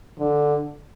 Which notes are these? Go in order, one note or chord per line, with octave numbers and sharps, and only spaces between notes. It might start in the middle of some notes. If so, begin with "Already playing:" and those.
D3